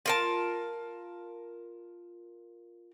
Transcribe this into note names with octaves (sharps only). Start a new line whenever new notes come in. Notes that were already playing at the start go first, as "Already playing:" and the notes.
F4 A#4 A5